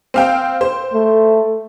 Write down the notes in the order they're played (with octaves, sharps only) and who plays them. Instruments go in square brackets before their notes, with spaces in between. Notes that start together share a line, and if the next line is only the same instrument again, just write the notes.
[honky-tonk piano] C4 F5 G5
C5
[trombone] A3